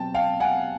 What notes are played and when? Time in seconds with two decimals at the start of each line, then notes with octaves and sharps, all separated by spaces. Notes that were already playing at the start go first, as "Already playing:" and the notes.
Already playing: B2 F#3 C4 G5 A5
0.14 F5 G5
0.40 F#5 G#5